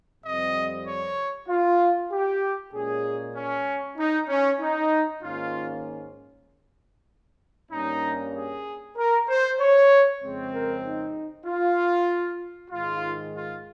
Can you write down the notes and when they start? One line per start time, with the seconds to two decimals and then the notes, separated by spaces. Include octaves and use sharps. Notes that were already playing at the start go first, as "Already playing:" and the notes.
0.23 F2 C3 G3 C4 D#5
0.86 C#5
1.48 F4
2.11 G4
2.73 A#2 G#3 C#4 G#4
3.35 C#4
3.97 D#4
4.29 C#4
4.60 D#4
5.22 G#2 D#3 A#3 C#4 F4
7.71 G2 G3 A#3 C#4 D#4
8.34 G#4
8.97 A#4
9.28 C5
9.59 C#5
10.21 F2 C#3 G#3 C4
10.53 A#4
10.84 D#4
11.46 F4
12.71 G#2 D#3 G#3 F4
13.34 F4